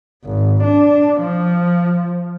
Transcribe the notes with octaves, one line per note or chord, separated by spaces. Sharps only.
G#1
D4
F3